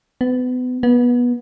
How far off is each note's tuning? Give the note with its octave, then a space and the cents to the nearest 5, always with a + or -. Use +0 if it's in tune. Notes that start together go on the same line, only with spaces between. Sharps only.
B3 +30
B3 -20